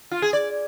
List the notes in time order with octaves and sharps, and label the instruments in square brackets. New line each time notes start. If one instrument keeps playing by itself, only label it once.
[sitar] F4
G#4
D5